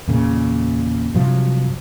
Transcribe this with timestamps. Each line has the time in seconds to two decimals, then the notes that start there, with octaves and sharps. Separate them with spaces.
0.08 E2 A#2 C#3
1.14 G2 C3 F3 F#3